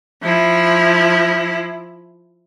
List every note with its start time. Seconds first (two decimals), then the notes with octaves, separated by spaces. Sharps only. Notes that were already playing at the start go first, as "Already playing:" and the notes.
0.23 F3 E4